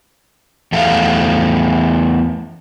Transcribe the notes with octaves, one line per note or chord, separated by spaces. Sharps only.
E2 A3 F5